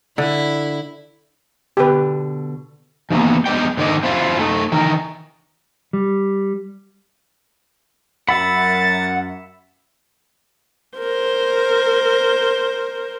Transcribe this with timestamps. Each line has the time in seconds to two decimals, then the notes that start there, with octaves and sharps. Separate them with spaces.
0.18 D3 E4
1.77 B2 D3 G4 B4
3.10 D#3 E3 G#3 A#3 B3
3.46 G#3 B3 D5 G5
3.77 G#2 D3 D#3 D5 D#5
4.03 C4 E4 F4
4.39 A3 D#4
4.72 D#3 E3 A#4
5.93 G3
8.29 F#2 E5 F#5 B5 A6
10.98 A#4 C5